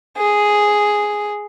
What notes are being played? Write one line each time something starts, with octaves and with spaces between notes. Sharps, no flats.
G#4